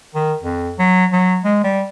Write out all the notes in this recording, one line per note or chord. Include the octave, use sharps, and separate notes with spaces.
D#3
F2
F#3
F#3
G#3
G3